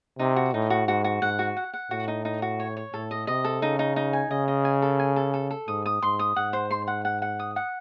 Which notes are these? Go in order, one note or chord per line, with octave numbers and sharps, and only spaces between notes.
C3 D#4
F#4
A2 D#4
F#4
G#2 F#4
F#4
G#2 F#5
F#4
F#5
F#5
A2 F#4
D#4
D#4
F#4
C#5
C#5
A2 A4
D#5
C3 D#5
A4
C#3 D#4
D#4
D#4
G#5
C#3 D#5
D#5
G#5
A4
G#5
A4
A4
A4
G#2 D#6
D#6
G#2 C6
D#6
G#2 F#5
C5
C6
F#5
F#5
F#5
D#6
F#5